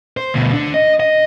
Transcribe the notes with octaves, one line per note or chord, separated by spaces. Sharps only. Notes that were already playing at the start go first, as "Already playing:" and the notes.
C5
D2 B2
D3 D4
D#5
D#5